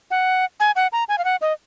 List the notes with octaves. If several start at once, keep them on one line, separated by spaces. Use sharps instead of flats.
F#5
G#5
F#5
A#5
G#5
F5
F#5
D#5